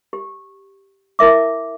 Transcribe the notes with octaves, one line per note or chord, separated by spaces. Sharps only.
G4
E4 A#4 E5 D6